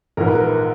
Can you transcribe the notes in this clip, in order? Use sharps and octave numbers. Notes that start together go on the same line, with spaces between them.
A#1 G#2 E3 A#4
B4
A#4